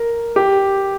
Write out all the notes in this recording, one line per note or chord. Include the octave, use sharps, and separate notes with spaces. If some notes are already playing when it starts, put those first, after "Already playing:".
Already playing: A#4
G4